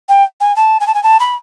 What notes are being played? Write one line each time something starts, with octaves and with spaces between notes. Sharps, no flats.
G5
G#5
A5
G#5
A5
G#5
A5
B5